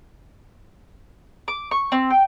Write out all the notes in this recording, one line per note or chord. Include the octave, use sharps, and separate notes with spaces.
D6
C#6
C4
G5